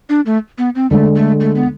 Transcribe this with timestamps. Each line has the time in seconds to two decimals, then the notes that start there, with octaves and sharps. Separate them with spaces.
0.09 D4
0.26 A3
0.58 B3
0.75 C4
0.91 D3 G#3 A3 D4 A4
1.15 A3
1.40 A3
1.55 B3